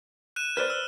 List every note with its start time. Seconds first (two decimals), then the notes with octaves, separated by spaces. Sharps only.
0.36 F#6 D#7 E7
0.57 B4 C5 D5 F6
0.70 E6